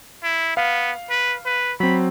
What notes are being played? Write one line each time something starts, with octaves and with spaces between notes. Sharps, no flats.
E4
B3 F5
B4
B4
F#3 C4 B5